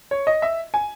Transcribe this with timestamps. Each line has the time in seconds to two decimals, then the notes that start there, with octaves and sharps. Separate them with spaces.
0.11 C#5
0.27 D#5
0.42 E5
0.74 G#5